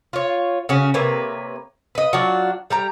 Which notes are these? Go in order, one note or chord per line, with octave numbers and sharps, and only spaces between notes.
F4 C#5
C#3 C#4 F#4
C3 A#3 B4 C#5
B4 D#5
F#3 D4 F4 F#4
G3 G4 A#5